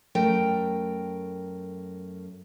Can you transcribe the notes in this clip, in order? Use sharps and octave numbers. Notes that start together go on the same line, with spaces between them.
F#2 A3 A#4 G5